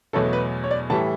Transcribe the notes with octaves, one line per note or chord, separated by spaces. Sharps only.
E2 B2 F#3 A3 A4
B4
C#5
D5
A2 E3 G3 A5